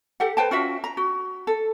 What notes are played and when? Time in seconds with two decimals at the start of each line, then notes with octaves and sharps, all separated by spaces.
0.20 G4 A4 F#5
0.37 B4 C5 G5 A5
0.51 C#4 F4 F#4 E5
0.84 A#5
0.97 F#4
1.47 A4